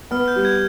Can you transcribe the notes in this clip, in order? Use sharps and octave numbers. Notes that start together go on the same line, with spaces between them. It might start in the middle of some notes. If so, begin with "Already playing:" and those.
B3 F6
G6
G3
G#6